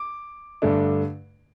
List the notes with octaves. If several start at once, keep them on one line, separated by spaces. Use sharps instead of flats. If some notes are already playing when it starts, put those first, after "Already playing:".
Already playing: D6
G2 D3 A3 D4